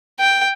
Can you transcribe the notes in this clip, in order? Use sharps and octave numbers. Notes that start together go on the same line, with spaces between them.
G5